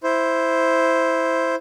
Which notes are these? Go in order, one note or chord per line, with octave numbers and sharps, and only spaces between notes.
E4 C5